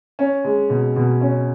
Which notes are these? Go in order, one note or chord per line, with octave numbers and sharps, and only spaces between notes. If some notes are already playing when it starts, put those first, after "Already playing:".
C#4
G#3
B2
B2
C#4